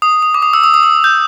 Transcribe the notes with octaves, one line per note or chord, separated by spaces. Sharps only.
D#6
D#6
D6
D#6
E6
D#6
D#6
E6
G6